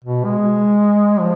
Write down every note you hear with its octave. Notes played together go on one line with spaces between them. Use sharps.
B2
G#3
F3